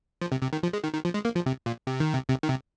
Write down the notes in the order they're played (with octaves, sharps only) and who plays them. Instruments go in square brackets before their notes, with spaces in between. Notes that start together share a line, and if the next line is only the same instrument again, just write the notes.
[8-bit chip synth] F3
C3
C3
D#3
F3
G#3
D#3
D#3
F3
G#3
A#3
F3
C3
A#2
C3
D#3
C3
C3
D#3
C3